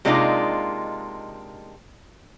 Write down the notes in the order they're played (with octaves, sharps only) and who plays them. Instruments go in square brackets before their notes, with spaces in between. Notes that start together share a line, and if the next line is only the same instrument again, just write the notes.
[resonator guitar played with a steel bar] C3 G#3 A#3 D4 D#4 F4